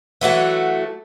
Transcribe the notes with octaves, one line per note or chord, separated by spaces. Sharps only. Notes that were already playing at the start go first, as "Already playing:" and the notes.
E3 F#3 A3 F#4